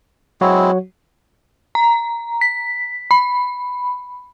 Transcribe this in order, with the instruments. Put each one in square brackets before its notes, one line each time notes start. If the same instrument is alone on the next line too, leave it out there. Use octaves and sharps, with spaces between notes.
[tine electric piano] F#3 F#4 C#5 [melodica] G#3 C4 E4
[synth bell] A#5
B6
B5